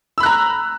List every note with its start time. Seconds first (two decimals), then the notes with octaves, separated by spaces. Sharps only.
0.18 E6
0.20 B5
0.23 F#6
0.26 A#5